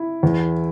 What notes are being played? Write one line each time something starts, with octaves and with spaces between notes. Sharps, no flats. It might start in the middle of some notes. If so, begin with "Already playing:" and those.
Already playing: E4
E2